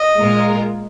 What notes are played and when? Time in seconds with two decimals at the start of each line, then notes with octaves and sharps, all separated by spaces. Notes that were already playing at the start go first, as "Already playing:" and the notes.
Already playing: D#5
0.17 A#2 G#3 F4 A#4